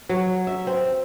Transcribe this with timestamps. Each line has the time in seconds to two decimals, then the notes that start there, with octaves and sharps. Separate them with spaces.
0.09 F#3
0.47 E5
0.67 C4